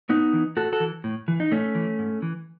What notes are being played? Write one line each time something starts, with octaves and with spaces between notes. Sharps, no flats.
A2 B3 D#4
E3
A2 F#4 A4
F#4 A4
E3
A2
E3
D#4
A2 A3 C#4
E3
G#2
E3